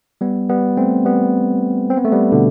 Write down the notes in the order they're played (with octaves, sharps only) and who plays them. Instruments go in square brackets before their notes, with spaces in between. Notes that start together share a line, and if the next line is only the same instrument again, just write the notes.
[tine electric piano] G3 B3
G3 B3
A3 C4
G3 B3
C4
B3
A3
G3 B3
B2 D3